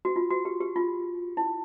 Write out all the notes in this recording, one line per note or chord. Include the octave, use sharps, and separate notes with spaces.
F#4
F4
F#4
G4
G4
F4
E4